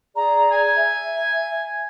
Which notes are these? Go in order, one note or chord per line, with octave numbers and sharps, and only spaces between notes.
G#4 D5 A#5
G#5
E5